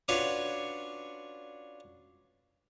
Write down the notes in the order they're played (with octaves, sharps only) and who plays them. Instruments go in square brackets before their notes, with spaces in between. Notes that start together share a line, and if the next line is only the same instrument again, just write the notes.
[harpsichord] C#4 D4 F4 F#4 B4 C#5